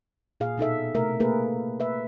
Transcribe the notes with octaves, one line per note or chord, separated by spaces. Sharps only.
A#2 G#4 F5
B2 D#4 A4 E5
C3 A3 A#4 E5
A3 A#3 G#4 A#4 B4
B4 E5